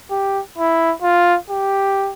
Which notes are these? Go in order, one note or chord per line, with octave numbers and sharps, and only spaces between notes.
G4
E4
F4
G4